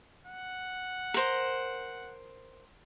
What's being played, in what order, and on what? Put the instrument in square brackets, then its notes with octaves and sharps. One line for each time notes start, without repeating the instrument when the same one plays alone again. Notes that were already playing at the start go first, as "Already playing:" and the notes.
[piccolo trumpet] F#5
[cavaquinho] A#4 C5